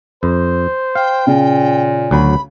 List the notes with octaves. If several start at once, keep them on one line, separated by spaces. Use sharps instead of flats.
F2 C5
F5 G5
A#2 C#3
D2 F#3 B5